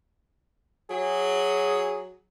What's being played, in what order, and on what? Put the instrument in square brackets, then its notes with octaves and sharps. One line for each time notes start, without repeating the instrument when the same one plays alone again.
[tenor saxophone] F#3 [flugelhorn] G#4